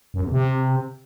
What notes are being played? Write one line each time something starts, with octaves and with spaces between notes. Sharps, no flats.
F#2
E2
C3